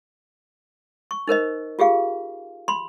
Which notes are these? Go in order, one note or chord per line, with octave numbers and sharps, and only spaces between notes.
C#6
D#4 A#4 C5 D#5
F4 G4 G#4 F5
B5 C6